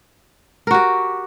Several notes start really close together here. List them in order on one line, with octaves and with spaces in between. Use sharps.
A#4 F#4 G4